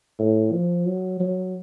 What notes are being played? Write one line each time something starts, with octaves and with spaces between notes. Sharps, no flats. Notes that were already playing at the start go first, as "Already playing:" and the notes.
A2
F3
F#3
F#3